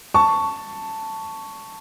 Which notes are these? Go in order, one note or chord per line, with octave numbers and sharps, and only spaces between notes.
A5 C#6